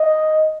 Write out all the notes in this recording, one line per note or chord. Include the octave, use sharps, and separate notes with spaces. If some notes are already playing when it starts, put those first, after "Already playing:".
Already playing: D#5